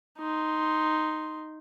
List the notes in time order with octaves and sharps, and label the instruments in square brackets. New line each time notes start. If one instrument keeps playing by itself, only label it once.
[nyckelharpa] D#4 C6